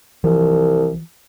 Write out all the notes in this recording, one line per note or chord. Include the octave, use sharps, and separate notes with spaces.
C2 E3 F3